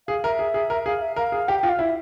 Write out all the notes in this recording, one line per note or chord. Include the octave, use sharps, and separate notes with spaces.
G#4 F5
A#4 E5
G#4
G#4
A#4
G#4 F5
E5
A#4 F5
G#4
G4 G5
G5
F4
F5
E4 E5